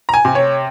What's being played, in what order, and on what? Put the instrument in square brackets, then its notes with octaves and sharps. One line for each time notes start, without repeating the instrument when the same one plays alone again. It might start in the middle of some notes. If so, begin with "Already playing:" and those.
[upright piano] A#5
G#5
C3
C#5